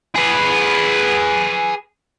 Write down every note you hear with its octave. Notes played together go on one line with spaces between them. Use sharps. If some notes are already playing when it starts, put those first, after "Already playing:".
G#4 B4